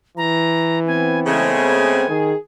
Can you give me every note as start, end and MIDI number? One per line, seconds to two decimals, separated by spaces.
0.17 1.58 52
0.17 0.79 82
0.87 2.04 59
0.87 2.04 60
0.87 1.20 80
1.27 2.05 49
1.27 2.05 56
1.27 2.05 57
1.27 2.23 80
2.09 2.33 51
2.09 2.35 68